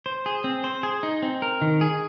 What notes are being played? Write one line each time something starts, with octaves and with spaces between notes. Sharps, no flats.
C5
G#4
C4
C5
G#4
D#4
C4
A#4
D#3
G#4